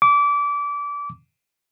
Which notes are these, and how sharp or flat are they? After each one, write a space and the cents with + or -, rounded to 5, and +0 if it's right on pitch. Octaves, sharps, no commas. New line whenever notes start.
D6 -25